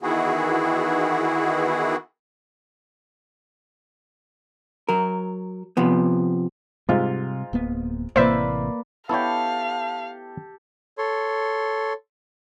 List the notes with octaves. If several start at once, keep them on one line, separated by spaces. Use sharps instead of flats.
D#3 E3 B3 E4 F#4 G#4
F#3 A#4
C3 F3 B3
G#2 C3 G3 F4
D1 A#3 B3
A1 C3 E3 A#3 B4 C5 D5 E5
B3 E4 G4 A4 C#5 F5
A4 C#5 C6